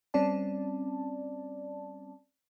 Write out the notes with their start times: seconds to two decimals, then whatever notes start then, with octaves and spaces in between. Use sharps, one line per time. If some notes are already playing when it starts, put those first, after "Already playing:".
0.14 G3 C4 C#4 D5 A5